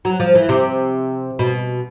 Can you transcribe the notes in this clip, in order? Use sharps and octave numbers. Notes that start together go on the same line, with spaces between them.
F#3
F3
E3
C3
B2